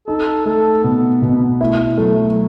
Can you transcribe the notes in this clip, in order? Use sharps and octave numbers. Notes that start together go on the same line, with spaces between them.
D#4 A4
A3 A4
B2 B3
B2
A3 E4
F#3 A3
F#3